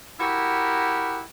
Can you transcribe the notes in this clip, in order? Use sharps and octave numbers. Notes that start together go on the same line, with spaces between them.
E4 F#4 G4 A#4